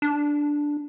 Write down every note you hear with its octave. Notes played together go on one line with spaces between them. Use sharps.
D4